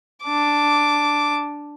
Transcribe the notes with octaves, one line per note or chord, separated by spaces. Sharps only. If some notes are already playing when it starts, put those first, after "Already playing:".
D4 D6